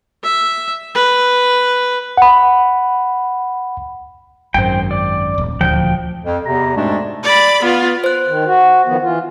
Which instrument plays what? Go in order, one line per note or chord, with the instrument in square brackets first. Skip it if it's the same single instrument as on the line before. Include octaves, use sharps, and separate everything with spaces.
[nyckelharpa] E5
B4
[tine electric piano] F#5 B5
[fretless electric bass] G#1 F#2 [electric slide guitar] C5 G5
[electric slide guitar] D5
[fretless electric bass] D#1
[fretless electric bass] D#1 D2 [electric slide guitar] F3 G5
[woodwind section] F2
E2 C3 A#5
F2 G#2 B2 G#3 A3 D4
[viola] D5 B5
B3 F4
[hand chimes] C5 F#6
[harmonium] D#3
F#4
D#3 F3 B3
E3 F4